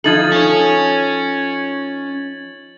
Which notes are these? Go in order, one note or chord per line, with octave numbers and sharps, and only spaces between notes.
F3 D#4 A4 G#6 A6 F#7
C#4 C#5